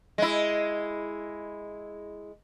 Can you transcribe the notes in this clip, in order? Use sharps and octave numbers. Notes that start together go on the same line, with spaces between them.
G#3 E4